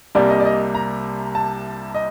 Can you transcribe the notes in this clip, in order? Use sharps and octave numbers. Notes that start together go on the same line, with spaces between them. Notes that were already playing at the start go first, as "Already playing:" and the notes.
C2 C3 G3 A#3 D5
D#5
D5
D#5
A#5
A5
D#5